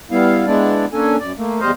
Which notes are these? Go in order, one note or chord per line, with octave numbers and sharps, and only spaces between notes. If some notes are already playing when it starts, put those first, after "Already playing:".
G3 B3 E4 F5
G#3 B3 D4 E4 D5
A#3 C#4 D4 A4 G#5
F#2 D5
A3 A#3
E2 G3 C5 D#5 F5